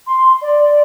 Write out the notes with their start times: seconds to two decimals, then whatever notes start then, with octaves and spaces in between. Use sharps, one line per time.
0.06 C6
0.41 D5